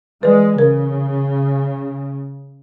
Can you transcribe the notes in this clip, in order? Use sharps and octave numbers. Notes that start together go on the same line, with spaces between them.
E3 G#3 B4
C#3 A#4